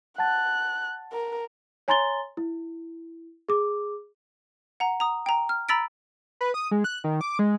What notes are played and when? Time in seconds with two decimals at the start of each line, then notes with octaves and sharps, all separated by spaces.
0.18 F#5 A5 F#6 A6
1.13 A#4
1.88 C#5 G#5 A#5 C6 A6 G7
2.37 E4
3.49 G#4 D6
4.80 F#5 A#5
5.00 A#5 D#6
5.26 G5 A#5
5.49 F6
5.69 A#5 B5 E6 A6 B6 D7
6.41 B4
6.54 D#6
6.71 G#3
6.84 F#6
7.04 D#3
7.21 D6
7.39 G#3